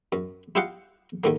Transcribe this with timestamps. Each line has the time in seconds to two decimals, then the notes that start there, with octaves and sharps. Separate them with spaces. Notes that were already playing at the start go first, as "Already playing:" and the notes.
0.12 F#2
0.55 E4 F4 G4 D#5 F5 F#5
1.24 D#2 A2 A#3